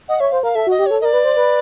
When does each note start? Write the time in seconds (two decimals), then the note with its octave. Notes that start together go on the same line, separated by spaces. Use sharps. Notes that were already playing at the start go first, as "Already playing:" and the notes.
0.08 D#5 F#5
0.20 C#5 E5
0.31 C5 F5
0.43 A#4 F5
0.55 A4 E5
0.67 F#4
0.71 D#5
0.79 G4
0.86 A4 C#5
1.01 A#4 D5 D#5
1.13 B4
1.25 C5
1.37 B4